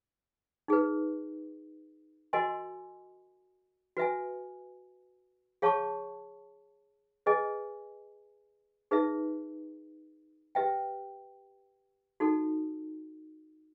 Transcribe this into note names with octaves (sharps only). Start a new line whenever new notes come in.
D#4 G#4 B4
F#4 A#4 D#5 G#5 C6
F#4 B4 E5 G#5
G#4 C#5 F5 A5 C#6
G#4 B4 D#5 G#5
D#4 G#4 B4 E5
G4 B4 E5 G5
D#4 F#4 A4